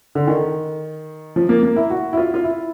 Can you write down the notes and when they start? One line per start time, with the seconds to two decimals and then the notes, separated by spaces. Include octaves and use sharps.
0.15 D3
0.27 D#3
1.36 F3
1.49 A#3
1.63 A#3
1.76 E4
1.90 F#4
2.13 E4
2.17 F4
2.34 F4
2.44 E4